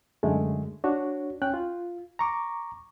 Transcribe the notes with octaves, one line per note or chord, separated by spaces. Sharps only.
F#2 D3 G#3 A3
D4 F#4 C#5
C#4 G5 F#6
F4
A#5 C#6 D6